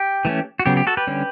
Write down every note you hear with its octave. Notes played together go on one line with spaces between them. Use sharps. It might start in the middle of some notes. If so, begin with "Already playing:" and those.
Already playing: G4
E3 A3 C#4
F#4
C#3 F#3 B3 G4
G4
F#4 A4
G4 B4
D3 G3 C#4